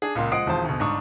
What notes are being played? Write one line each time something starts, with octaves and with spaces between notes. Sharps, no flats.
D4 G#4
C#2 A#2 A#3 C6
F3 G#3 F#5 D#6 C7 D7
E1 D#2 F3 C4 C5 A5
D2 B2
G1 G#2 D4 C#6 D#6